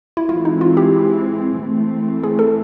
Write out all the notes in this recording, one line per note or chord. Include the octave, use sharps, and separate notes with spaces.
E4
E3 G#3 C4 F4
D#4
F4
G4
E3 A3 C4
G#4
A4